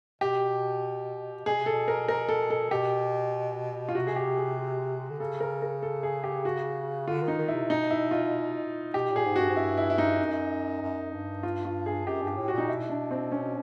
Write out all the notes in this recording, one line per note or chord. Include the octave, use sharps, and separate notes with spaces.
B2 G4
B2 G#4
C3
A4
B2
A#4
A#4
A4
A4
B2 G4
F4
C3 F#4
G#4
G4
G#4
D3
C#3 A4
A#4
A#4
A4
G#4
G4
F#4
D3 F4
D#3
D#4
D#3
E4
C3
C3
B2 D#4
E4
F4
B2 G4
A#2
G#4
G#2
F#4
G2
G#2
G2 E4
E4
E4
D#4
F#2
F#2
G2
F4
F4
G#4
F#2 G4
G2 G4
A2
F#4
A#2 D#4
B2 E4
D4
C4
C#4